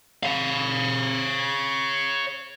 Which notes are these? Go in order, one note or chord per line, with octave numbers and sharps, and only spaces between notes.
C#5 F5